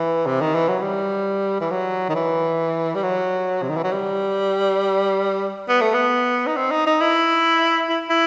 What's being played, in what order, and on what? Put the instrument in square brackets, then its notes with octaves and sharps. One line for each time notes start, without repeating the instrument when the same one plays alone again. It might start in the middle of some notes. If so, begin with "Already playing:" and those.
Already playing: [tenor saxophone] E3
C3
D#3
E3
F#3
G3
E3
F#3
D#3
E3
G3
F#3
C3
D#3
E3
F#3
G3
B3
A3
B3
D#4
C4
D#4
D#4
E4
E4
E4